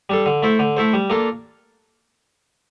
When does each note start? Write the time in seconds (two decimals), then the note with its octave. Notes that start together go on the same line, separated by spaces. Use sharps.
0.10 G3 D4 A4
0.26 D3
0.43 A3 E4 A4 C5
0.59 D3
0.77 A3 E4 A4 C5
0.94 G3
1.10 A#3 D4 F4 A4